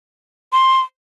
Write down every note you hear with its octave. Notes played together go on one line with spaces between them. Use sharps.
C6